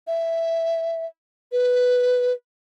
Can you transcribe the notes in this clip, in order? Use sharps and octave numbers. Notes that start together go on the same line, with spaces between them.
E5
B4